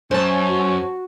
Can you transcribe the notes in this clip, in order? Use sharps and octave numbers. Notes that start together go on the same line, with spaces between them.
F#2 C#4 C5 C#5 A5
F#4